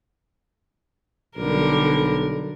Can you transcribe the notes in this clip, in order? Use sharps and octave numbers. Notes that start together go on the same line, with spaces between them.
B1 D3 G3 A#4